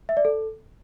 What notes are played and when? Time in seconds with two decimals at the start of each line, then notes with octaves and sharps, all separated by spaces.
0.09 E5
0.17 D5
0.25 A4